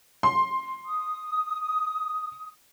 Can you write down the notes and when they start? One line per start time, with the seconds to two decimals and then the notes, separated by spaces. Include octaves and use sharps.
0.23 C6
0.86 D#6